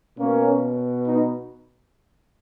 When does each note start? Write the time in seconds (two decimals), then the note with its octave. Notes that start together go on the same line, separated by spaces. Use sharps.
0.18 B2 A#3 C#4
1.07 B3 D#4